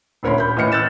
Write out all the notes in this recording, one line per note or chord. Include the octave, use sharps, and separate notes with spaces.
D#1 D2 A#4 C#5 B5 C6
B5 G6
A2 E3 D#5 F6 C#7
E6 F#6 G6 A6 E7